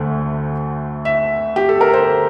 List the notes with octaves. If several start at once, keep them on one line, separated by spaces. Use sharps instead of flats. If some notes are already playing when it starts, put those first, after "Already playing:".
Already playing: D2 D3 A3 C4
E5
G4
A4
A#4
C5